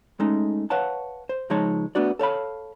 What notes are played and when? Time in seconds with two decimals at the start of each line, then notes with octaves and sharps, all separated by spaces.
0.20 G#3 A3 C#4 D#4
0.70 B4 C#5 F5 F#5 A5
1.29 C5
1.50 C#2 F3 G#3 D#4 C#5 A5
1.95 A3 B3 D4 F#4 D5
2.19 A4 C#5 F5 B5